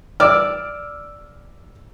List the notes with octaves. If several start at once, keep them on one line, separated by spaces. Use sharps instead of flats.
D5 D6 E6 F6